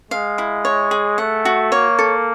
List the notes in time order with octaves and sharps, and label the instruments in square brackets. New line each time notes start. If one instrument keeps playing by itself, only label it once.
[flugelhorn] G#3 [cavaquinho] F5
[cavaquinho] E4
C#5
G#4
[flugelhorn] A3 [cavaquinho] F#5
[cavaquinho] F#4
[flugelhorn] A#3 [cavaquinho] C#5
[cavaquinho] A4